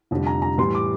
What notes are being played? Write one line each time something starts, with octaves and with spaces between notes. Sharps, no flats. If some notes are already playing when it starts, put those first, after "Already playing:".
F1 F2 D3 G3
A#5
A#5
A2 E3 G3 C6
D6